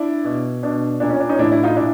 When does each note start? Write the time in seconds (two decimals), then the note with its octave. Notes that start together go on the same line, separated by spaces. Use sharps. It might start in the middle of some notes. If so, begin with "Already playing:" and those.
Already playing: D4 E4
0.24 B2
0.63 B2 D4
1.00 A#2 D4
1.10 C#4
1.20 D4
1.29 C#4 D#4
1.39 A2 E3 D4 E4
1.51 D4 E4
1.63 D#4 F4
1.76 A#2 D4 E4